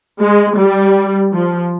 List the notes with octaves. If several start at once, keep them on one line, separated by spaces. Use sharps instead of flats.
G#3
G3
F3